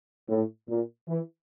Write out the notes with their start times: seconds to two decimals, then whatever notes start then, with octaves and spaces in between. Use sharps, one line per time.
0.29 A2
0.68 A#2
1.07 E3